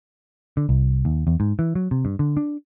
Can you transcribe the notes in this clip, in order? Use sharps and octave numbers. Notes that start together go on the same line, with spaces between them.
D3
C2
D#2
E2
G#2
E3
F#3
C3
G2
D3
D4